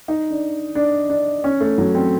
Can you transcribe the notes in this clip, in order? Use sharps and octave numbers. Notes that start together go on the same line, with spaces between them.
D#4
D4
D4
D4
C#4
A3
F#3
C4